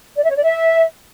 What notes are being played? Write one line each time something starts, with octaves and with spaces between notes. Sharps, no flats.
D5
E5
C#5
D5
E5